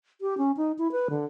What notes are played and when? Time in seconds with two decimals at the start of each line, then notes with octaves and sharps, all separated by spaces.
0.21 G4
0.38 C#4
0.57 D#4
0.79 E4
0.92 B4
1.10 D3